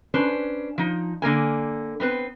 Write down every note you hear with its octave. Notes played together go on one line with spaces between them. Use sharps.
C#4 D4 B4 C5
F3 D#4
D3 A#3 A#4 G#5
B3 C4 B4 C5